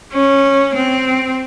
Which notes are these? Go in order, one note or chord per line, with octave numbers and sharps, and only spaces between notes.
C#4
C4